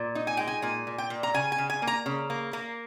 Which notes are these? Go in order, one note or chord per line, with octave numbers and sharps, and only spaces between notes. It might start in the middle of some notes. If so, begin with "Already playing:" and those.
Already playing: A#2
D#4
G#5
G#3 G5
G#5
A#2 G#5
A#2
G5
A#2
A#5
C#3 G#5
G#5
C#3
G#5
A#3
A#5
C#3
A#3
A#3